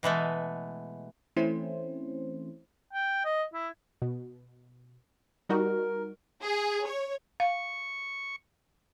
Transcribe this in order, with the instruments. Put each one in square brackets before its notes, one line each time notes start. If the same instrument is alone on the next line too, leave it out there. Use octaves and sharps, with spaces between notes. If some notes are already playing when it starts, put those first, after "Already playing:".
[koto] B2 E3 G#3 A3
[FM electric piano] E3 A3 C4 C#4 E4 C5
[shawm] G5
D#5
E4
[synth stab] B2
[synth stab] G3 D#4 F#4 [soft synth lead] A#4
[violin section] G#4
C#5
[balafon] F5 [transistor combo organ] C#6